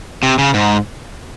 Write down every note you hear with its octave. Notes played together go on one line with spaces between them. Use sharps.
C3
C#3
G#2